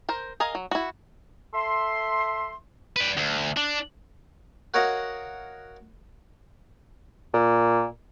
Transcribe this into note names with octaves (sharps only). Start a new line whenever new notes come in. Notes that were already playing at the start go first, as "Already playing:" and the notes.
A#4 C5
G#4 A#4 D#5 F5
F#3
E4 F#4
A4 E5 C6
B4 D5
D2
D4
F#4 A#4 C#5 D#5 F5 F#5
A#2